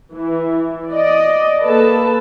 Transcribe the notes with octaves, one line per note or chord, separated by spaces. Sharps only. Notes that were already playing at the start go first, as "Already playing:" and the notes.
E3
D5 D#5
A#3 A4 B4 A5